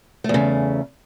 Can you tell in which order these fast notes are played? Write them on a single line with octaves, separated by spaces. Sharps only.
A3 E2 C#3